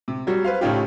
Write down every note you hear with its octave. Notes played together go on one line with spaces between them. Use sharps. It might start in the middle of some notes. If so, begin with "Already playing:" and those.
C3
F#3 G3 F#4
B4 C5 F5
A2 C#3 C#4 D#4 F4 G4